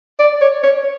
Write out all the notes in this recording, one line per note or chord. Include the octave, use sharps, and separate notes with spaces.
D5
C#5
C#5